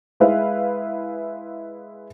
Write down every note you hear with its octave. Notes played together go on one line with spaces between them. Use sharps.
G#3 E4 B4 E5 F5